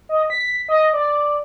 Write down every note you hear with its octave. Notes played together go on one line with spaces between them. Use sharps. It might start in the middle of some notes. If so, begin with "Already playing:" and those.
D#5
B6
D#5
D5